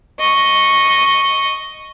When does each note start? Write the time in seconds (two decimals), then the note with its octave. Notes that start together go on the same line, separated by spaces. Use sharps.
0.19 D#5 C#6